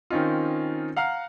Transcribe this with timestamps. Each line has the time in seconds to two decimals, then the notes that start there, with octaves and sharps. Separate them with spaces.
0.11 D#3 C4 C#4 D#4 F4
0.97 F5 F#5 A#5 F6 C7